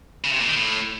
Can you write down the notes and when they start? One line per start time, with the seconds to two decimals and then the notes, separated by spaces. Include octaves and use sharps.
0.24 C#3
0.32 C3
0.40 A#2
0.48 D#3
0.55 A2